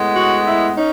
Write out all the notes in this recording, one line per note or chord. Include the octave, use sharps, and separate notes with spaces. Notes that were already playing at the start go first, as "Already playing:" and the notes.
Already playing: A2 G#3 B3
F#4
E4
C#4 D#4